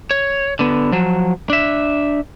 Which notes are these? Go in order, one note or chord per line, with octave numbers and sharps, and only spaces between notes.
C#5
D3 B3
F3 F#3
D4 E5